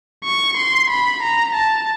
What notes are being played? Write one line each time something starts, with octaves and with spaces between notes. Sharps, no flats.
C#6
C6
B5
A#5
A5